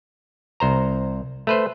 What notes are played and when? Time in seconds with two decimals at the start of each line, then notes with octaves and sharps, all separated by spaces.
0.60 C2 C5 A#5
1.47 A3 B4 C5